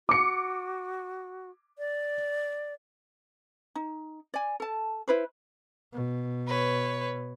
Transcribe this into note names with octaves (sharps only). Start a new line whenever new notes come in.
F#4 D6 C#7
D5
D#4
D5 G#5
A4 A5
E4 B4 C5
B2
B4 C#5